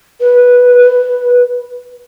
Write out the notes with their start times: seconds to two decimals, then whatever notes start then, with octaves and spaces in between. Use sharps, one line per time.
0.21 B4
0.81 B4